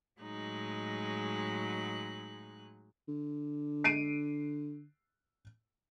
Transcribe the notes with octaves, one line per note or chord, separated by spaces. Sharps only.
A2 F#3 G#3 D#4 F#6
D3
C7 D7 D#7